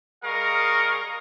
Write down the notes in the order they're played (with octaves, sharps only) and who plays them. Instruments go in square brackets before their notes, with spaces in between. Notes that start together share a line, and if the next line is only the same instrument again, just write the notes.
[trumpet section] G3 G#4 A#4 D#5 F5 C#6